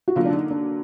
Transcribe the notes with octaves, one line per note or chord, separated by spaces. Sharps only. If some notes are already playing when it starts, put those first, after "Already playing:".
F#4
D3 F#3 A#3 F4
D4
D#4
D4